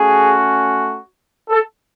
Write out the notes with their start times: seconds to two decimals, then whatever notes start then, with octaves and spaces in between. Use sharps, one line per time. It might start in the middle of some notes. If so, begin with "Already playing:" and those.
Already playing: A3 C#4 F#4 G#4
1.49 A4